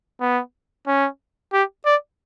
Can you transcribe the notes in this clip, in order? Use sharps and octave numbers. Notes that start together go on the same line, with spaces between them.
B3
C#4
G4
D5